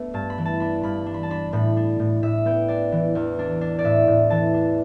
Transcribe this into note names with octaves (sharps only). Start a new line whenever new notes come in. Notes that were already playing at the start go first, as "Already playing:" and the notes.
Already playing: A3 B3 D4
G2 A5
B5
E3
A5
D4 B5
G2 B5
D4
B5
A5
D4 B5
A2 B5
D4
A2
A2 E5
B3 G5
D4 D5
E3
E2
D4
D4
D5
A2 E5
A2
E3 A5
D4